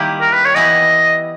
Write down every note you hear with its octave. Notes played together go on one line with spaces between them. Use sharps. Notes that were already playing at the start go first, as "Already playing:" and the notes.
Already playing: D#3 G3 A#3 E4 G4
A#4
B4
C#5
E3 G3 B3 E4 D#5